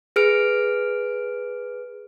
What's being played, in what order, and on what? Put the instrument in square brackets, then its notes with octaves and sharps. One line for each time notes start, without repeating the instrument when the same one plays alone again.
[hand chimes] G#4 B4 F6 D7